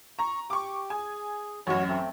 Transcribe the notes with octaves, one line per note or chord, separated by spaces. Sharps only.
A#5 C#6
G4 C#6 D6
G#4 G#5
A1 F#2 F#4 C#5
A3 C4